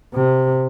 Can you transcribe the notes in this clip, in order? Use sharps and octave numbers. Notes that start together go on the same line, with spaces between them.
C3